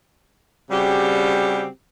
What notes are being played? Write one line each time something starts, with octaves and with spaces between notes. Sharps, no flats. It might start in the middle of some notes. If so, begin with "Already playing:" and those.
C#3 G3 C4 F#4 G4